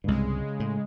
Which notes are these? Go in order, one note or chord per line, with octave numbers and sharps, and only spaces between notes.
C2 G2 C#3 G#3
A2